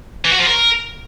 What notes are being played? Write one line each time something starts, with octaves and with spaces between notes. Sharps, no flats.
E3
F#4
F3
A#4